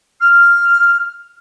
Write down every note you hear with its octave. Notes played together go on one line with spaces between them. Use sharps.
F6